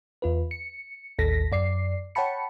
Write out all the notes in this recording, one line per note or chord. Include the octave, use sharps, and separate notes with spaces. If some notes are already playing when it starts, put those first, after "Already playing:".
E2 F4 B4
C#7
A1 D#2 A4 A#6 B6
F#2 D5 C7
C#5 F#5 G5 A5 B5 C#7